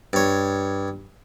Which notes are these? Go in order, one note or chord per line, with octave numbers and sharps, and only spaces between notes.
G2 C#5